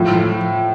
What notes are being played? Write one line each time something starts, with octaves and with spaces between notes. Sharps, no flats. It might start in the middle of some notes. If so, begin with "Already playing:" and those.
Already playing: A2 F3
F3